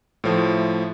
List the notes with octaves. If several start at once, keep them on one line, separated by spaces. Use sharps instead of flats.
A2 F3 A3